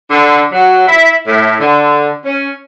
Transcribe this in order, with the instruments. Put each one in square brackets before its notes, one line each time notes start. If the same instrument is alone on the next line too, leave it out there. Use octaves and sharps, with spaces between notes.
[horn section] D3
F#3
E4
A2
D3
C#4